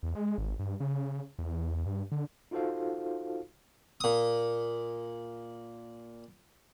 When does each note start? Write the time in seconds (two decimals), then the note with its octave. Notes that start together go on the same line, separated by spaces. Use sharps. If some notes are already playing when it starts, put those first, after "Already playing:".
0.03 E2
0.15 G#3
0.38 G#1
0.59 G2
0.80 C#3
1.39 E2
1.86 G2
2.12 D3
2.51 D#4 F4 F#4 A4 C5 F5
4.01 A#2 D#6